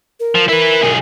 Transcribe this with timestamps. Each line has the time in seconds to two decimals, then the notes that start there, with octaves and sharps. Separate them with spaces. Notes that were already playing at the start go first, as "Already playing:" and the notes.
0.20 A#4
0.35 F3
0.49 E4 A#4 B4
0.83 B1 G#4